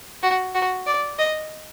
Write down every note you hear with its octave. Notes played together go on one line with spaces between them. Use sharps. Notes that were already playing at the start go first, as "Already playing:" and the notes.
F#4
F#4
D5
D#5